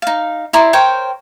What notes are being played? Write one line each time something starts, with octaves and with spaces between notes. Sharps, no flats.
D#4 F5
E4 D5 A#5 C6
A#4 C5 C#5 G5